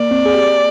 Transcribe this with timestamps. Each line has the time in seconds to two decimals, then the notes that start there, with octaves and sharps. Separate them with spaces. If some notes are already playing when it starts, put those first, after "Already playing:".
Already playing: A#3 D5
0.11 C4
0.26 G#4
0.35 G4